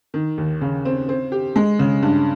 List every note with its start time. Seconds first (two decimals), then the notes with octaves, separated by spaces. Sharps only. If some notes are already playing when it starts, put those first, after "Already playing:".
0.14 D#3
0.38 D#2
0.61 C#3
0.85 C4
1.09 C4
1.32 G4
1.56 G#3
1.79 C#3
2.03 G2